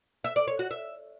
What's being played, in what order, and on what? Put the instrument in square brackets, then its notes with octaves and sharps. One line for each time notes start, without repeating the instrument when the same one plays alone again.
[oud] E5
D5
C#5
F#4
E5